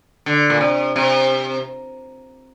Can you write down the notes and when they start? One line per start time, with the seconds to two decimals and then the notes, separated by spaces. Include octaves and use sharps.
0.26 D3
0.50 A#2
0.61 C3
0.96 C3